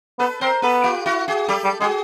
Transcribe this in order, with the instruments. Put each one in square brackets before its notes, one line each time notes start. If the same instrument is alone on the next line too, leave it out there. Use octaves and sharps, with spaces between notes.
[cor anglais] B3 [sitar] A4 B4
[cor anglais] C4 [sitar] A#4 C5
[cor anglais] B3 [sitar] A4 B4
[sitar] F4 G4
E4 F#4
F#4 G#4
[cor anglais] G3 [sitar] G4 A4
[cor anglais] G3
[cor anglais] G#3 [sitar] F#4 G#4